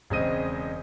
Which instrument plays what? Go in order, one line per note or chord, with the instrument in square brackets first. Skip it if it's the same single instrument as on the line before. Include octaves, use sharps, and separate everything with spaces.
[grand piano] E1 C#3 G#3 C4 D#5 D#7